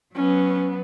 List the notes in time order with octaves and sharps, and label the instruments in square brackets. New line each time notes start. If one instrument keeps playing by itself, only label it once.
[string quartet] F#3 B3 [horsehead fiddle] C#4